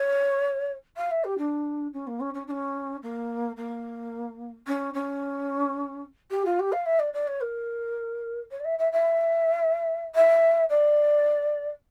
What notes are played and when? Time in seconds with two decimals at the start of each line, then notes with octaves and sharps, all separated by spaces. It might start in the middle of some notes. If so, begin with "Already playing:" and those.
Already playing: C#5
0.97 F5
1.11 E5
1.24 G4
1.38 D4
1.93 C#4
2.07 A#3
2.20 C#4
2.34 C#4
2.47 D4
2.51 C#4
3.03 A#3
3.57 A#3
4.67 C#4
4.94 C#4
6.31 G4
6.46 F4
6.59 G4
6.72 F5
6.86 E5
6.99 D5
7.14 D5
7.27 C#5
7.41 A#4
8.51 C#5
8.60 D5
8.65 E5
8.79 E5
8.92 E5
10.15 E5
10.70 D5